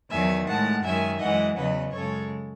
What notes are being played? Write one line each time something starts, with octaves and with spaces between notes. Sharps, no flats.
E2 D#3 F#3 E5 G#5
A2 G#3 F#5 A5
F#2 D#3 G#3 E5 G#5
F#2 E3 G#3 D#5 F#5
E2 C#3 F#3 B4 D#5
F#2 C#3 G#3 A4 C#5